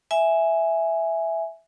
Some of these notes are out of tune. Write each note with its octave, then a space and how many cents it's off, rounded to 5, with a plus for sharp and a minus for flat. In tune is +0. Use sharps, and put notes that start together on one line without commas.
E5 +0 G#5 +0